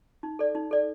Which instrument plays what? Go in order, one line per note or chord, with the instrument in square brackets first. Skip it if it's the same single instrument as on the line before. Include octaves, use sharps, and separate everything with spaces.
[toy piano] D#4
A4 D5
D#4
A4 D5